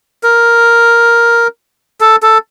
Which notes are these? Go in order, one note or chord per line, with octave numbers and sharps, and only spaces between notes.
A#4
A4
A4